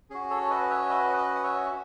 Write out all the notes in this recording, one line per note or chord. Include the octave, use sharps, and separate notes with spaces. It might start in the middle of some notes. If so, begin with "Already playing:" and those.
C#4 F#4 G#4
A4 C#5
B4 D#5
C#5 E5
B4 D#5
B4 D#5
F#5
C#5 E5